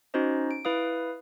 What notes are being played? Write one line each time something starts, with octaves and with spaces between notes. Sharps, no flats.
C#4 D#4 F#4 C5 D#5
D7
E4 B4 F5 D#6